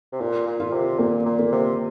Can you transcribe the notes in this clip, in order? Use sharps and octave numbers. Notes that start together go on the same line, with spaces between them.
C3
A#2 F4
A#2
F4
C3
A#2 A#3
A#2
A#3
C3